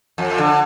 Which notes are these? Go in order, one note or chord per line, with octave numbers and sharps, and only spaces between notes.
F2
D3